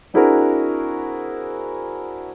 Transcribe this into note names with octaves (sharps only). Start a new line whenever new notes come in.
C4 D4 E4 F#4 G#4 A#4